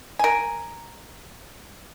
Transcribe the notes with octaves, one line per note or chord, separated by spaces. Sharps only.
A#4 G#5